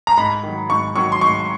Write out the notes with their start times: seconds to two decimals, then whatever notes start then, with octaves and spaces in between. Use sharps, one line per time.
0.07 A#5
0.17 G#2 B5
0.43 D#3 F#3
0.69 G#2 C#6
0.96 D#3 F#3 C#6
1.12 C6
1.21 G#2 C#6